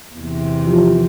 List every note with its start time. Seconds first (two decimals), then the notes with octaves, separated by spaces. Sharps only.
0.15 E2 C3
0.65 F3 F4 G4